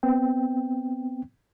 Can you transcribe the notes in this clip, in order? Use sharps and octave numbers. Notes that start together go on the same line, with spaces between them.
B3 C4 G5